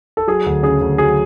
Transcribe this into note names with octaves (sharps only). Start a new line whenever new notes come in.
A4
F#3 G#4
D2
C#3 G#4
D2
F#3 G#4